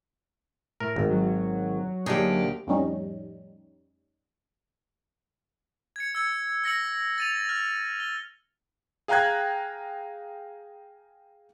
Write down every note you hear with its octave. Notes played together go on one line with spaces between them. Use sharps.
A2 A#4
G#1
F#3
D2 A#3 D4 D#4 G4 G#4
F2 A2 G3 C#4 D#4
G#6 C#7
E6 G#6 C#7
E6 A#6 C#7 F#7
A6 D#7 F7
F6
G7
G#4 F5 G5 A#5 F#6 G#6